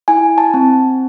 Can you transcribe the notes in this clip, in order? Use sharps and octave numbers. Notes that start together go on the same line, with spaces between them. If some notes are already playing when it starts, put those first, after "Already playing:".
E4 G#5
A5
C4